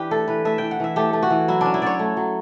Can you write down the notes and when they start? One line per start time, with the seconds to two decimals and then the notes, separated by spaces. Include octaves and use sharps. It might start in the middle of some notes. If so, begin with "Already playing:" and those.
Already playing: E3 D4 G4 B4
0.11 A3 A4
0.28 E3 B4
0.45 A3 E5
0.58 E3 G5
0.71 F#5
0.80 E3 E5
0.96 A3 G4
1.13 A3
1.23 F#4
1.30 E3
1.48 F#3 E4
1.61 C#4 D4
1.74 E4
1.82 F#3 C#5 D5
1.99 A3
2.17 F#3